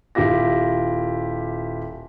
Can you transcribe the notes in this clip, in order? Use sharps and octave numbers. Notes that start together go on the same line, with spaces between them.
D#1 E4 F4 G4 A#6